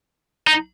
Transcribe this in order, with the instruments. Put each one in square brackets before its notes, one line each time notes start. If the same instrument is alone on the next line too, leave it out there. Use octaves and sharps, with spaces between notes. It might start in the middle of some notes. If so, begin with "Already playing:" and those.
[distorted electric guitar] D#4